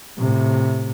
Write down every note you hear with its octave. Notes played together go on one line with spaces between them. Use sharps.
A2 C3